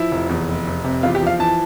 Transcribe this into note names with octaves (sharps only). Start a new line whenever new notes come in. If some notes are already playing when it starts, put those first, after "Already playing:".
Already playing: F3 E4
F1
E2
F1
F1
C3
E2 F4
G4
F3
F5
E3 A5